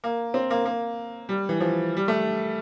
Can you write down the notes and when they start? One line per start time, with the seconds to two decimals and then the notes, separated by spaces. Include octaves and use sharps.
0.04 A#3
0.34 C4
0.50 A#3
0.66 A#3
1.29 G3
1.49 E3
1.60 F3
1.97 G3
2.08 A3